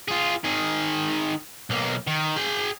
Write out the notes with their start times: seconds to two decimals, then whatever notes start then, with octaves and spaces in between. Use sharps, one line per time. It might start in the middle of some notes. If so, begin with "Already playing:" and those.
0.08 F4 G#4
0.44 D#3 G#4
1.70 B1 A#3
2.07 D#3
2.37 G#4 G5